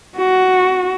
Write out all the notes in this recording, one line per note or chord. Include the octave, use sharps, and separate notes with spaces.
F#4